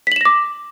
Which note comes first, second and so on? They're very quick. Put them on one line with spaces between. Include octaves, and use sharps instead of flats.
B6 F#7 E7 A#6 D6